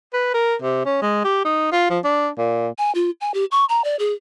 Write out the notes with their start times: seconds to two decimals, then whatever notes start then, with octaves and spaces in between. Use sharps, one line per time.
0.14 B4
0.34 A#4
0.62 C3
0.85 C#4
1.02 G#3
1.24 G4
1.45 D#4
1.72 F4
1.90 F3
2.04 D4
2.38 A#2
2.78 G#5
2.95 F4
3.21 G#5
3.34 G4
3.52 C#6
3.69 A#5
3.84 D5
3.99 G#4